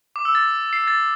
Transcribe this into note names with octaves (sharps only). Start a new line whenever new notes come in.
D6
E6
A6
C7
A6